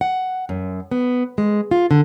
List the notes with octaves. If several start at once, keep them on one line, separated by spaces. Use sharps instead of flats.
F#5
F#2
B3
G#3
F4
D3